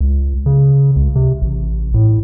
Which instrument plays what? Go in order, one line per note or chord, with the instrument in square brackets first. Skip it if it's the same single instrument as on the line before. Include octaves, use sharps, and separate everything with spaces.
[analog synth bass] C#2
C#3
C#2
C3
A1
A2